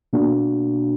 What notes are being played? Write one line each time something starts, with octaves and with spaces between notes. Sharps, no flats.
B2 A#3 D4 F#4